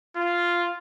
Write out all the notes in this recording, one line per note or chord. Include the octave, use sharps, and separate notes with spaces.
F4